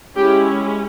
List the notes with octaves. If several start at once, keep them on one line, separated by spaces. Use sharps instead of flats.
G#3 C#4 E4 G4